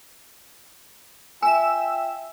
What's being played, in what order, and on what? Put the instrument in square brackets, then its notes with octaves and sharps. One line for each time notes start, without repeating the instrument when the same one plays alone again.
[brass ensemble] F4 G5 [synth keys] E5 E6 [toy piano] G#5